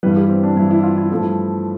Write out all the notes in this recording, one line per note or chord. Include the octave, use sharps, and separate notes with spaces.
G2 E3 G3 B4
G4
C4
D4
G2 E3 G3 E4
E4
F4
E4
G2 F3 A3